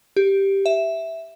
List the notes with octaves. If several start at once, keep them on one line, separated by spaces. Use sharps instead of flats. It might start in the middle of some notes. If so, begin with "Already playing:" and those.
G4
E5